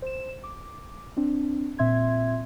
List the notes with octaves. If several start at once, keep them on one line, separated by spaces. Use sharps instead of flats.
C5 E7
D6
C4 D4
A#2 C4 E5 C6 G#6